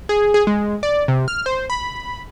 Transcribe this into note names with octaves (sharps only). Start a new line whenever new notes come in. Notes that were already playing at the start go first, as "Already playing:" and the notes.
G#4
G#4
G#3
D5
C3
F6
C5
B5